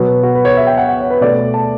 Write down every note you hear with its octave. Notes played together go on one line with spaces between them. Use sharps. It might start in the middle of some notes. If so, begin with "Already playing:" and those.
Already playing: B2 F#3 B3
F#4
B4
C#5
E5
G5
F#5
F#5
C#5
B4
B2 A3 D5
A5